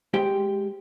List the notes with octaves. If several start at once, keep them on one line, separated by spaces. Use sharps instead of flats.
G#3 G4 C5 G5